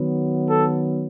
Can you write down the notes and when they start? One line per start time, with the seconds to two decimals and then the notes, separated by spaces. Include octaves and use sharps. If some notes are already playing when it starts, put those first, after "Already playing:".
Already playing: D#3 F#3 B3
0.49 A4